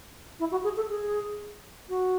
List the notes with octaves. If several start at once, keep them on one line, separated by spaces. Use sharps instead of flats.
E4
F#4
G#4
A4
G#4
F#4